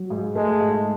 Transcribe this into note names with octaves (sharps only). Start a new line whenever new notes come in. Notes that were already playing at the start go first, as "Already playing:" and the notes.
Already playing: F#3
G#2
G#3 A3
G#2